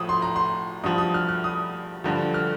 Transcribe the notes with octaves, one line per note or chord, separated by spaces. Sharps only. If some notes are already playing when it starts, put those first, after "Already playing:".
Already playing: A2 F3 D#6
C6
A#5
C6
G2 F3 D#6
D#6
F6
F6
D#6
G2 D3 F3
F6